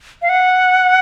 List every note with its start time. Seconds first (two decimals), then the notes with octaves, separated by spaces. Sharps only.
0.22 F5
0.29 F#5